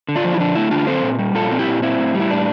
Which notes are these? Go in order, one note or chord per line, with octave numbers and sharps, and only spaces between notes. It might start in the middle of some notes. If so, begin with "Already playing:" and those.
D3
D4 F4
F3
E4
D3 D4
A3 E4
D3 D4 F4
C4 A4 C5
A#2
G3
A#2 F4 A4
C4
E4 G4
A#2
C4 E4
A2
G3
E4
A2 D4